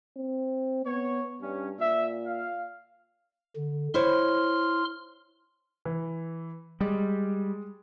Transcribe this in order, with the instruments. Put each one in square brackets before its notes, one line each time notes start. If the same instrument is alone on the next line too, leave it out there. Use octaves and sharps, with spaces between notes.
[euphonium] C4
[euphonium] B3 [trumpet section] C#5
[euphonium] G2 [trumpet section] C#4
[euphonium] A#2 [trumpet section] E5
[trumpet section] F5
[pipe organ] D3
[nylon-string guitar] E4 C5 C#5 [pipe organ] C6 F6
[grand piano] E3
[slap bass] G3 [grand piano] G#3